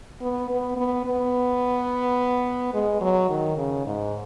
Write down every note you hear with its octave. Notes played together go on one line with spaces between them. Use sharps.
B3
B3
B3
B3
G#3
F#3
D#3
C#3
G#2